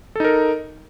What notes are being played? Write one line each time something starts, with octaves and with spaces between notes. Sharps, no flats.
D#4 A4 A#4